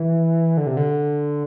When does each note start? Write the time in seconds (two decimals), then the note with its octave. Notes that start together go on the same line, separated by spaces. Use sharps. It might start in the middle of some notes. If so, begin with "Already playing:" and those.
Already playing: E3
0.57 D3
0.67 C3
0.77 D3